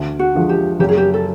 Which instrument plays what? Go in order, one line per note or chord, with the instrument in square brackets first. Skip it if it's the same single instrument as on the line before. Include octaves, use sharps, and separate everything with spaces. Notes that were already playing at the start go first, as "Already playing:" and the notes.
Already playing: [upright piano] D2
[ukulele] F#4
[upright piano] D3 F3 G#3
[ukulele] G4
[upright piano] F#1 [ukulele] G4
[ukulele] G#4
G4
A4